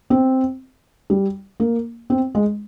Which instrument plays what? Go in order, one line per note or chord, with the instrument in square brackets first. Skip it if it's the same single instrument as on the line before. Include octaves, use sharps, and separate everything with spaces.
[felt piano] C4
G3
A#3
C4
G#3